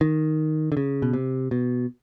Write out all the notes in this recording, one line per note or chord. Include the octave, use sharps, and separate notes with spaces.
D#3
D3
C#3
B2
C3
B2